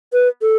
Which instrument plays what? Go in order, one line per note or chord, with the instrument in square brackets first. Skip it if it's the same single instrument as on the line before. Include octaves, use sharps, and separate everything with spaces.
[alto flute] B4
A4